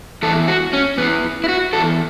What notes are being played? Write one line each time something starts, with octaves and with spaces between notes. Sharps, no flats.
E2 E3 A4
F#4
C#4
E2 B3
E3
E4
F#4
E2 E3 A4